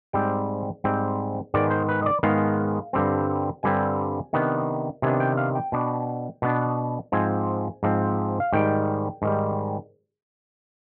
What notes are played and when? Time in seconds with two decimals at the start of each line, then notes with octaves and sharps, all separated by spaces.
0.13 G#2 G3 C4 G5
0.84 G#2 G3 C4 G5
1.54 G#2 D#3 G#3 B3 D5
1.71 C5
1.89 B4
2.02 D#5
2.06 D5
2.23 G#2 D#3 G#3 B3 F5
2.93 G2 D3 G3 C4
3.63 G2 D3 G3 C4 G#5
4.33 C3 D#3 B3 D4
5.02 C3 D#3 B3 D4 G#5
5.20 G5
5.37 F5
5.55 G5
5.72 B2 B3 D4
6.42 B2 B3 D4
7.12 G#2 F3 C4 G#5
7.83 G#2 F3 C4
8.40 F5
8.53 G#2 D#3 G3 G5
9.22 G#2 D#3 G3